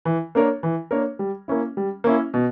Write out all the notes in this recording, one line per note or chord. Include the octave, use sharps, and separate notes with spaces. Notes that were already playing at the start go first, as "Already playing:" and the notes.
E3
A#3 D4 A#4 C#5
E3
A#3 D4 A#4 C#5
G3
A#3 C#4 E4
G3
A#3 C#4 E4
B2